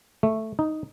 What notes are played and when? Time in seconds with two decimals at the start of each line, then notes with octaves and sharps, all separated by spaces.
0.23 A3
0.59 D#4